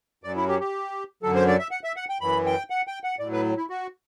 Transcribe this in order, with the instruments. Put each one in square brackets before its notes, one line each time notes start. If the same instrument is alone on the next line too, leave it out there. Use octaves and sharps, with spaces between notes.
[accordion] F#2 F#3 D5
E4
G4
G4
F#2 D3 F#3 A4
C5
D5
E5
F#5
E5
F#5
G5
F#2 E3 B5
G5
F#5
G5
F#5
A2 F#3 D5
B4
E4
F#4